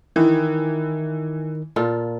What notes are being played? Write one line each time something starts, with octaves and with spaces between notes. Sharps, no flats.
D#3 E3
A#2 F4 A4